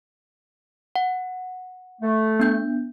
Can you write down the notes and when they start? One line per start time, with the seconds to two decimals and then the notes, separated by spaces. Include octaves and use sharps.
0.96 F#5
2.02 A3
2.40 B3 D4 G6